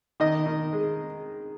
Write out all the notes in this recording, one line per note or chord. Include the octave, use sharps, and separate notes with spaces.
D#3 D#5
D#3
G#3